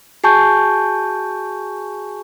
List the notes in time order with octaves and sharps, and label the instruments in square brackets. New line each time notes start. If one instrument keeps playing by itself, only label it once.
[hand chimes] F#4 G#4 G#5 A5 C#6 G6